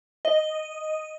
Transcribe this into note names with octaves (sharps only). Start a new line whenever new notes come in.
D#5